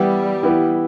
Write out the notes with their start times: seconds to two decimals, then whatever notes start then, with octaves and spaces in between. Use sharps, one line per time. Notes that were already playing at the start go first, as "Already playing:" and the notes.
Already playing: E3 G3 B3 E4 G4
0.43 E3 B3 E4 G4